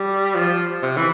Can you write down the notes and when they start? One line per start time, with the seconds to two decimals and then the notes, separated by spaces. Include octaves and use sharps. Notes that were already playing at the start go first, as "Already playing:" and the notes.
Already playing: G3
0.35 F3
0.83 C3
0.97 E3